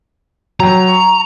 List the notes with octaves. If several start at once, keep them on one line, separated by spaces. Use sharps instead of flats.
F#3 G5 A#5
C#6